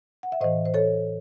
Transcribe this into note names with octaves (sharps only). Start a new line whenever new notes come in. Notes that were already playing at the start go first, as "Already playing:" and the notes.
F#5
E5
A2 E3 C5 D#5
C5
A4 C#5